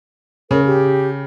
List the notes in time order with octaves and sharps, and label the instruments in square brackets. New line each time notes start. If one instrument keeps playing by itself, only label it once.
[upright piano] C#3 [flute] A#4
[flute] G4